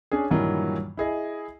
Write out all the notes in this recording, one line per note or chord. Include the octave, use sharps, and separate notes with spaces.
C#4 D4 G#4
G2 A#2 D#3 E3 F#3 G3
E4 G#4 D#5